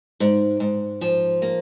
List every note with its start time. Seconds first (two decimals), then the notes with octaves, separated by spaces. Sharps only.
0.20 G#2
0.60 G#2
1.01 F3
1.42 A#3